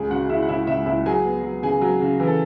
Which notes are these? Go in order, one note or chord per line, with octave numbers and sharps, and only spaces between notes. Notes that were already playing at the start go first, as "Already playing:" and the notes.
Already playing: C#2 G#4 G#5
C#3 F#4 F#5
C#3 E4 E5
F#5
C#3 E4 E5
C#2 E4 E5
C#2 E4 E5
F#3 G#4 G#5
B3
F#3
C#3 G#4 G#5
F#3
C#3
E3
A4